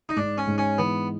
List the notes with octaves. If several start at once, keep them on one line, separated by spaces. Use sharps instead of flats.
D#4
G#2 D4
C#4
G#2
C#4
E3 B3